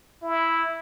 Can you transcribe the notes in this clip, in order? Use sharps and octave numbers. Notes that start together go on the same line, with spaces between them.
E4